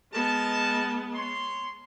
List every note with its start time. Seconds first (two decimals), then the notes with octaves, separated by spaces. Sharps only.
0.13 G#3 B3 A#4 A5
1.14 C#5 C6